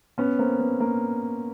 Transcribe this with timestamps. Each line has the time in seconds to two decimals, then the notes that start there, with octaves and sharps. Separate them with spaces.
0.18 B3 C#4
0.39 A#3 C4
0.59 B3
0.80 A#3